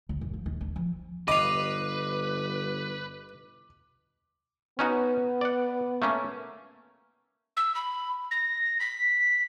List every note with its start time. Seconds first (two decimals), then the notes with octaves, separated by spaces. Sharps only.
0.09 D2
0.21 F#2
0.34 F3
0.46 D#2
0.61 D4
0.76 F3
1.28 G1 B4 D#5 F5 D6
4.79 B3 C#4 D#4 F#4
5.41 D5 F#5
6.02 A3 A#3 C#4
7.57 E6
7.75 B5
8.31 A#6
8.80 B6